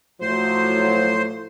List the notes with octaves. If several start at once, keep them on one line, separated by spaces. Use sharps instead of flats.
A2 F3 F#3 C5